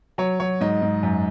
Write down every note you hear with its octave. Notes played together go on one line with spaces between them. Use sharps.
F#3 C#5
F#3 C#5
G#2 D#5
G#2
F#2